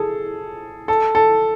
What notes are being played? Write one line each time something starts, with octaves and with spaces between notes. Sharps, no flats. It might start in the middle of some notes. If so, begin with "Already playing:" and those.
Already playing: G#4 A4
A4
A4